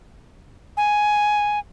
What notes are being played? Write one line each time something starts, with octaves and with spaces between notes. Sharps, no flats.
G#5